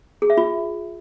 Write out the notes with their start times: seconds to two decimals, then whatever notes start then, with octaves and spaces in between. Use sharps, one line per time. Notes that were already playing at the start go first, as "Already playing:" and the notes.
0.22 G#4
0.30 E5
0.38 F4